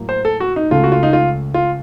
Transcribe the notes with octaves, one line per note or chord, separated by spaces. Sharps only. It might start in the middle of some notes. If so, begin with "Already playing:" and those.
Already playing: A2 F#3 A#3
C5
A4
F#4
D#4
C#2 C#3 A3 F4
F#4
F4
D#4
F4
F4